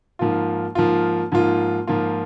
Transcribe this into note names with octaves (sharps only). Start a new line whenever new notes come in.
G#2 F3 A#3 F4
G#2 F3 A#3 F4
G#2 F3 A#3 F4
G#2 F3 A#3 F4